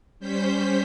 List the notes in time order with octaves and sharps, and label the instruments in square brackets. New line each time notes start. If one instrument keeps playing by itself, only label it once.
[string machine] G3 C#4 C5 G6 B6